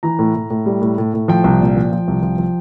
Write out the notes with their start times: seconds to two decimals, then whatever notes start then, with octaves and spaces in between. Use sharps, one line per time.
0.03 E3 A#5
0.19 A2
0.35 A2
0.50 A2
0.66 G3
0.82 A2
0.98 A2
1.14 A2
1.28 F3 G5
1.44 C2
1.60 A#2
1.76 F3
1.92 F3
2.08 C2
2.22 F3
2.38 F3